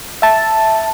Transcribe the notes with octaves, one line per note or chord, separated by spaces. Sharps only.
E5 A5